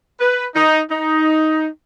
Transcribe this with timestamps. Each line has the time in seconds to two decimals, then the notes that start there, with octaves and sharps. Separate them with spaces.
0.19 B4
0.54 D#4
0.90 D#4